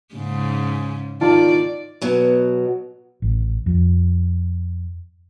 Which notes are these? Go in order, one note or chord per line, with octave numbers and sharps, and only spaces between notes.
G#2 C#3
D#3 F4 D5 A5
B2 F#3
A1
F2